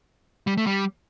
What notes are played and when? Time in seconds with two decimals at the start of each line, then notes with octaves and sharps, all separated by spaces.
0.47 G3
0.57 A3
0.67 G3